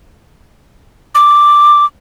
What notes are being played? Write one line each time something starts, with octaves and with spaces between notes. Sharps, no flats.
D6